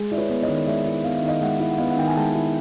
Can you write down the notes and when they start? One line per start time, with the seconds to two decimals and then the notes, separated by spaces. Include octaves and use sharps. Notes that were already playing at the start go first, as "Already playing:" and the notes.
Already playing: G#3
0.11 E4 D5
0.17 B4 C#5
0.29 B3
0.42 C#5 D#5
0.48 D#3
0.66 G#3 D5 E5
0.86 E4
1.04 B3 F5
1.16 E5
1.22 D#3
1.28 D#5 F5
1.41 G#3 E5 F#5
1.60 E4
1.70 F#5
1.78 B3 D#5 F5
1.90 F#5
1.97 D#3 G5
2.07 G#5
2.16 G#3 G5 A5
2.35 E4